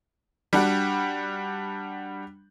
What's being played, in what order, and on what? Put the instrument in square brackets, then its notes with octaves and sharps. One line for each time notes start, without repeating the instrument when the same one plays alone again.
[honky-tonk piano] G3 D4 F#4